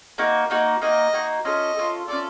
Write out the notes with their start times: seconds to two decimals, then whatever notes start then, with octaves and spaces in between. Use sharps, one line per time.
0.18 A#3 D#4 F#4
0.50 A#3 D#4 F#4
0.81 A#3 D#4 F#4 D#5
1.13 A#3 D#4 F#4
1.45 C#4 F4 A4 D#5
1.76 C#4 F4 A4
2.08 C#4 F4 A4 D5